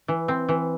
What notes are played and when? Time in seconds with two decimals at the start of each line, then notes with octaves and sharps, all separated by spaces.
0.08 E3
0.28 C4
0.49 E3